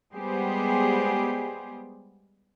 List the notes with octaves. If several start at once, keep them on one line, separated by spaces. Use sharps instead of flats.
G3 G#3 B3 G4 G#4 C5